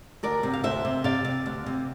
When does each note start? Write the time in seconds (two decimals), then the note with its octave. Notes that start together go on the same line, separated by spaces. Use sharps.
0.23 D2 A#4 D5
0.43 C3
0.53 F5
0.63 D2 C5 E5
0.85 C3
1.04 C3 D5 F5
1.25 C3
1.46 D2
1.66 C3